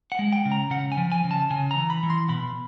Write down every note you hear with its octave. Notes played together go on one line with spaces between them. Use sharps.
F#5
G#3
G5
C#3
A#5
C#3 F#5
G#5
F3
G#5
C#3
A5
C#3 G#5
A#5
E3
B5
E3
C6
B2 B5